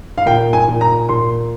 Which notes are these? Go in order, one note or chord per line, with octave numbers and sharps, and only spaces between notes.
F5
A#2 G5
G#5
A#2
A#5
A#2 C6